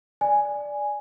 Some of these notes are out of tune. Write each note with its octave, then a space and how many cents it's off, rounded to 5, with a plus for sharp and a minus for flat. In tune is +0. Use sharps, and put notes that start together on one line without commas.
D5 +0 G#5 +0